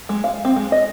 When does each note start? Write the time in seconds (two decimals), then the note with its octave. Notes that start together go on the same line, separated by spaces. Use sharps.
0.09 G#3
0.24 F5
0.45 C4
0.56 G#3
0.72 D#5